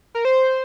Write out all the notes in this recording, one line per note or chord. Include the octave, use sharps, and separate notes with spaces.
A#4
C5